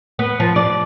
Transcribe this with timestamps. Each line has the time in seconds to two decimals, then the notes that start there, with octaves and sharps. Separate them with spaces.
0.19 B3
0.40 F3
0.56 D5